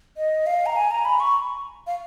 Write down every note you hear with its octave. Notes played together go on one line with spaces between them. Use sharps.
D#5
F5
A#5
G#5
A#5
B5
C#6
F5